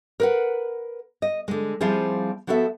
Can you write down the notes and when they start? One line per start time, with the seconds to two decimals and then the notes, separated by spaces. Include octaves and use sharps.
0.20 A#4 B4 F#5
1.22 D#5
1.48 D3 G#3
1.81 F3 G3 C4 E4 F4 G#4
2.47 F3 B3 F#4 A4 E5